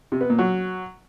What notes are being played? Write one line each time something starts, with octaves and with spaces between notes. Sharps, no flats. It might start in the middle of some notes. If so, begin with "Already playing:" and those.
C3
B3
A#2
F#3